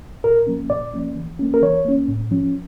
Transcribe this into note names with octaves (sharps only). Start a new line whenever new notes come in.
A#2 A#4
F3 A#3 C#4
A#2 D5
F3 A#3 C#4
E3
A#3 C#4
A#4
E3 C#5
A#3 C#4
A2
F3 C#4